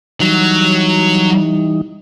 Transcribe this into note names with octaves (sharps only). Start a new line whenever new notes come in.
E3 F#3 G3 D#4